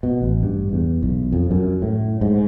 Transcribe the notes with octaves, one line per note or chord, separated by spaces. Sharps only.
B2
A1
G2
E2
B1
F2
F#2
A2
G#2